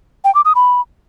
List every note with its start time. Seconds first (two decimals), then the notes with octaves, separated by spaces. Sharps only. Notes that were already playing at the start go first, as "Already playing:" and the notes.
0.24 G5
0.35 D6
0.45 D#6
0.55 B5